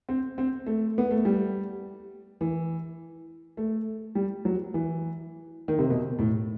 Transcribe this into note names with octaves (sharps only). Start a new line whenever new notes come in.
C4
C4
A3
B3
A3
G3
E3
A3
G3
F#3
E3
D#3
C3
B2
A2